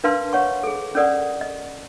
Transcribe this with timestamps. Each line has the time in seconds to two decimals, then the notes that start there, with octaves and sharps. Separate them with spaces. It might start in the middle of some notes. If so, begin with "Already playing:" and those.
0.04 D4 A#4 B4 F5 A5 C6
0.33 C#5 F#5 C#6
0.63 G#4 A4
0.95 C#4 A4 A#4 D5 F#5 D#6
1.41 D#5